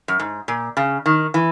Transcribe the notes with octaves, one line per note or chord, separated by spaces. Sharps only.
F#2
G#2
A#2
C#3
D#3
E3